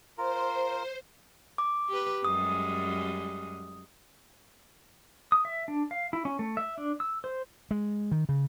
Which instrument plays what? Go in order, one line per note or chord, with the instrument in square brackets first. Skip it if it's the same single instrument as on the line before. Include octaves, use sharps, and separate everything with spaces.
[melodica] F4 A#4 [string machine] C5
[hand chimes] D6
[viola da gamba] G4 B4
[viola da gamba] F#2 G3 G#3 [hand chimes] D#6
[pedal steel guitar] D#6
E5
D4
F5
E4
C#4
A3
E5
D4
E6
C5
[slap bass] G#3
D#3
C#3